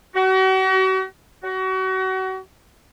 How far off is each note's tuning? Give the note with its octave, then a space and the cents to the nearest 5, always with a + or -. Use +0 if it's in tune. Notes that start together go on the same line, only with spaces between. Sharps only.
F#4 +40
F#4 +30